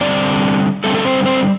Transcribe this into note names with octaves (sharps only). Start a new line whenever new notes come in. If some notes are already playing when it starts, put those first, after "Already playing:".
D3 G3 C4 D4 D5
D3 G3 A3 C4 A4
A4
C4 C5
C4 C5